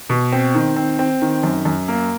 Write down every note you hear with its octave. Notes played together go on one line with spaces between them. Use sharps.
B2
C4
D#3
C4
C4
D#3
F#2
F#2
A#3